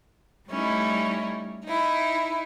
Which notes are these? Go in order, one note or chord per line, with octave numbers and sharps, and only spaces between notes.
G3 A3 C#4 D#4 E4
D#4 E4